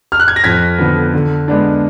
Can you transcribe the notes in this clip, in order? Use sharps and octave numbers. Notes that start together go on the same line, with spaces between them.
F6
F#6
G#6
A#6
F2 G#6 B6
D3 F3 B3
D3
G#3 B3 D4